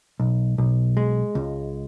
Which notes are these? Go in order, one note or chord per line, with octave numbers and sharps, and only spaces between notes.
B1
B1
G#3
C#2